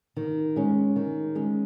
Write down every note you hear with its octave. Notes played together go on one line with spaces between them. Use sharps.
D#3
G#3 C#4
D#3
G#3 C#4